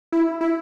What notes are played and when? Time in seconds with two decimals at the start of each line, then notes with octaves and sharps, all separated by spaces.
0.12 E4
0.41 E4